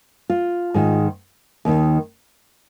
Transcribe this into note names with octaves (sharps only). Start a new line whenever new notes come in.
F4
G#2 D#3
D#2 D#3